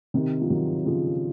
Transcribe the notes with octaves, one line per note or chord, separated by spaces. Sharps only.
C3 D#3
F3
D#3 F#3
C#3 F3